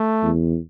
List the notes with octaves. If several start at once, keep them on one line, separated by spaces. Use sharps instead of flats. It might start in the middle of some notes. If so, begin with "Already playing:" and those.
Already playing: A3
E2